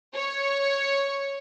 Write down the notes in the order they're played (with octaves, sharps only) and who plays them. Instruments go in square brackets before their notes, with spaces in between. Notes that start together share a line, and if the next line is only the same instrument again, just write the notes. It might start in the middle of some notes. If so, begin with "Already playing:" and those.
[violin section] C#5